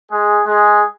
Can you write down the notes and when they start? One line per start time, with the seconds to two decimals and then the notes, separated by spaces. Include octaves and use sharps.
0.11 G#3 G#4
0.46 G#3 G#4